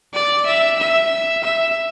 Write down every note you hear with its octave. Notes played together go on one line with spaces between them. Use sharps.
D5
E5
E5
E5